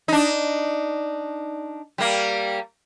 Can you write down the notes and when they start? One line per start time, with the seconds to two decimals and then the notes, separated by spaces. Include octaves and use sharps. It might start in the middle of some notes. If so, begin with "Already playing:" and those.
0.08 D4 D#4
1.98 G3 A#3